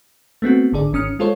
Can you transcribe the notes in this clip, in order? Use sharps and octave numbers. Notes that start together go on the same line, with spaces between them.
A3 B3 C4 F#4
G#1 D3 G#4 D5
G#1 D#3 C#4 D#6 F6 C#7
G#3 F4 A4 C5 C#5